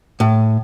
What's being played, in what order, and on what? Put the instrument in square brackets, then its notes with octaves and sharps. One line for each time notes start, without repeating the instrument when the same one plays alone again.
[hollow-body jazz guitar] A2